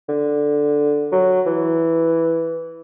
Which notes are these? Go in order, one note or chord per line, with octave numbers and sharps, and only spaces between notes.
D3
F#3
E3